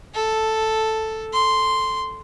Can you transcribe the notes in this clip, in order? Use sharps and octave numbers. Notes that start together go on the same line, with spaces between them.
A4
C6